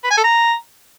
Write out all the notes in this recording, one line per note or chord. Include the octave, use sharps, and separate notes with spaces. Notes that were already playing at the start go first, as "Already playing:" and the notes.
B4
G#5
A4
A#5